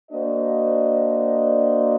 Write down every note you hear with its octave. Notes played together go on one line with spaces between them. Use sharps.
A#3 D4 F#4 C5 D#5